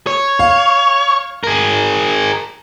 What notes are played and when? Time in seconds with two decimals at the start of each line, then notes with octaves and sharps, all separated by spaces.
0.07 C#5
0.39 F5
1.44 G#4 A#4